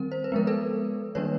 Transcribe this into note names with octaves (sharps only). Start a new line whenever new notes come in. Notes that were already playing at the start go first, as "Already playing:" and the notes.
Already playing: D#3 G3 C4 A#4
C5
B4
F3 G#3 B3 A#4
A4 B4
D#3 G3 A#3 D4 B4 C#5